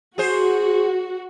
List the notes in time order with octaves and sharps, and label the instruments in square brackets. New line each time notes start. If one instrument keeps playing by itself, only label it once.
[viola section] F#4 [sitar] G#4 C5